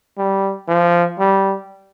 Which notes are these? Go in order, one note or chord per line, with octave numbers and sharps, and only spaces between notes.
G3
F3
G3